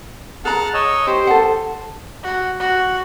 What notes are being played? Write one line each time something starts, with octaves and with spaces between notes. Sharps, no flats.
G#4 F#5 A5 A#5 F6
C#5 D#5 E6
G4 C5
A4 F#5
F#4
F#4